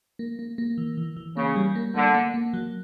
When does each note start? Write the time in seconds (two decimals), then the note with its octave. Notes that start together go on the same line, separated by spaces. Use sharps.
0.19 A#3
0.39 A#3
0.58 A#3
0.78 E3
0.97 E3
1.17 E3
1.37 C#3 A#3
1.56 G3
1.75 A#3
1.95 D3 A#3
2.14 A#3
2.34 A#3
2.53 F#3